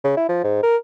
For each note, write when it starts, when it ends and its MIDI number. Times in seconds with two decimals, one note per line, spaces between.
0.04 0.17 49
0.17 0.25 64
0.29 0.41 53
0.44 0.61 44
0.63 0.77 70